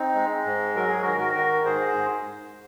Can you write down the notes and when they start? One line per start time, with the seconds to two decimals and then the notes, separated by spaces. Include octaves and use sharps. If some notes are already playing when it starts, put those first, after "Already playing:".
Already playing: C4 D#4
0.15 G#3
0.45 G#2
0.75 F#3 A#4
0.88 G#4
1.02 D#3 F#4 A#4
1.20 F#4 A#4
1.36 D#3
1.65 G#2 G#4 C5
1.96 G#2